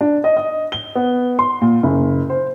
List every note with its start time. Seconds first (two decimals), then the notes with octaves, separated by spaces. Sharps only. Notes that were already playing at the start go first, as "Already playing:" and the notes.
0.01 D4
0.24 D#5
0.37 D#5
0.72 G7
0.95 B3
1.39 C6
1.62 A#2
1.83 F#1
2.30 C5